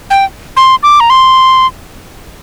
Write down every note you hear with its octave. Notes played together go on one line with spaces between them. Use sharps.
G5
C6
D6
A#5
C6